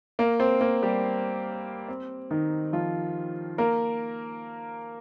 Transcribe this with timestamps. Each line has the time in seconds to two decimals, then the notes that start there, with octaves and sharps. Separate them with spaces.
0.19 A#3 A#4
0.40 C4 C5
0.61 A#3 A#4
0.82 G3 G4
1.88 C4
2.31 D#3 D#4
2.73 F3 F4
3.58 A#3 A#4